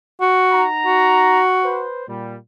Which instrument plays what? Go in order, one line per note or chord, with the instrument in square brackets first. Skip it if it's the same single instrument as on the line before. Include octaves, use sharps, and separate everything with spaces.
[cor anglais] F#4
[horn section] D#4 F#5 A#5
[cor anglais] F#4
[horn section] B4 C5
A#2 G3